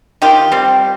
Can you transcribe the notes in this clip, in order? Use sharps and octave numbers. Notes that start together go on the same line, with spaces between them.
D#3 F4 G4
G3 C4